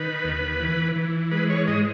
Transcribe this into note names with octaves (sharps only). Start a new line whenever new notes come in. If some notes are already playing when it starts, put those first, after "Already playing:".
Already playing: D#3 B4
D#2
E3
E3
G#3 B4
C#5
G#2 D#5